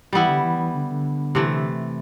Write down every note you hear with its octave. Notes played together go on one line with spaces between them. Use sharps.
E3 G3 B3 E4
D3
E3
E3
D3
D3
C3 E3 A3